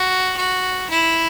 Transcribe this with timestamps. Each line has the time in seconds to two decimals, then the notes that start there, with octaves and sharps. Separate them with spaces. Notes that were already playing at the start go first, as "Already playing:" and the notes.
Already playing: F#4
0.37 F#4
0.90 E4